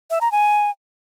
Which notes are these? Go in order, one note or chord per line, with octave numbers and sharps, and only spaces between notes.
E5
A#5
G#5